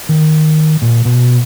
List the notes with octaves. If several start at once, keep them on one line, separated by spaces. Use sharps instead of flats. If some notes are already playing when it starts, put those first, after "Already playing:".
D#3
A#2
B2